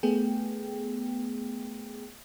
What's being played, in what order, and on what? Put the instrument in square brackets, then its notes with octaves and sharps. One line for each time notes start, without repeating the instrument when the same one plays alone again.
[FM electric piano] A3 B3 G#4 G5